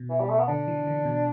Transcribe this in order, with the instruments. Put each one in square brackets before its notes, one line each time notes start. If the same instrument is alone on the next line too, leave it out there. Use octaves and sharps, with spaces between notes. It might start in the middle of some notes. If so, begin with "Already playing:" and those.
Already playing: [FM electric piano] B2
[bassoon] E3
G3
A3
B3
[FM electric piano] D3 [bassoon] D4
[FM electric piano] E3
D3
B2